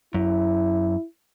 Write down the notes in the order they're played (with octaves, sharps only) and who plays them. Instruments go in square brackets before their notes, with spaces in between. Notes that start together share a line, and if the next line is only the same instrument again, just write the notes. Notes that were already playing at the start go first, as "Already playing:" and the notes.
[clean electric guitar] F#2 [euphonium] E4